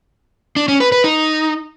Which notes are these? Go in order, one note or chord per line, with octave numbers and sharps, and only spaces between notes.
D4
C#4
B4
B4
D#4